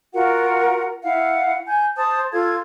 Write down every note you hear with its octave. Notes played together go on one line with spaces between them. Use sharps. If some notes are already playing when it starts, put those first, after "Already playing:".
F4 F#4 A#4 F#5
E4 F5 F#5
G#5 G6
C5 A5 D#6
F4 A4 F5 G#6